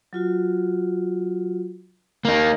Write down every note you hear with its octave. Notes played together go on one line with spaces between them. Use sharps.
F#3 F4 F#4
A#3 D#4 A#5